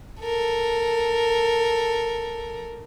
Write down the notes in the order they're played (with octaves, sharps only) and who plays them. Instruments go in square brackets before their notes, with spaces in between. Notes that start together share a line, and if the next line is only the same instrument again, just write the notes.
[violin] A4 A#4